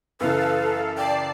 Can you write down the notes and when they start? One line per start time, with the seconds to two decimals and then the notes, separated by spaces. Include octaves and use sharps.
0.21 F#2 C#3 E3 A4 B4 F5
0.98 D5 G5 A5 C7